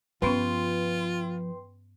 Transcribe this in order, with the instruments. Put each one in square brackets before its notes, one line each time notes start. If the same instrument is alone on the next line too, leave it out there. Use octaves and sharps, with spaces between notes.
[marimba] G2 B3 C#4 [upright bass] F3 [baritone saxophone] F4 [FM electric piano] B4 G5 C6